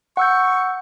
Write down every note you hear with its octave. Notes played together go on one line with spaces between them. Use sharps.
F#5 C#6 E6 G6